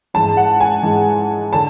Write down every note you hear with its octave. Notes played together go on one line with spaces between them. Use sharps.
G#2 E3 G#3 A5
F#5
G#5
G#2 E3 G#3
D3 A5